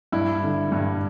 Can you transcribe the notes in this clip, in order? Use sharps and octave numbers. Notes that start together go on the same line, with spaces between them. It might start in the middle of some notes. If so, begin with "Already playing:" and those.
G2 E4
D3
G2